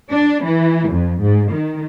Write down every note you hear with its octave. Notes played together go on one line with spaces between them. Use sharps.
D4
E3
F2
G#2
D#3